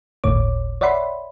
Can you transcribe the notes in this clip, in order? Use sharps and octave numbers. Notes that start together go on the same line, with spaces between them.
G1 D2 A2 C#5 D6
C#5 D5 E5 F#5 B5 C6